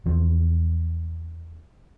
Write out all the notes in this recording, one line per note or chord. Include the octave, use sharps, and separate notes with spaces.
E2 F3